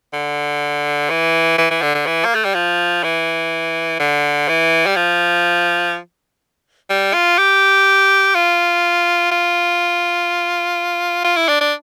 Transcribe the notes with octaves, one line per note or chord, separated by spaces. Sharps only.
D3
E3
E3
E3
D3
D3
E3
A#3
A3
G3
F3
E3
D3
E3
G3
F3
G3
F4
G4
F4
F4
F4
E4
D4
D4